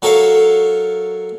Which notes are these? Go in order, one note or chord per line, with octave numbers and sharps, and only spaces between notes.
F#3 A4 A#4 C#5 E5 F5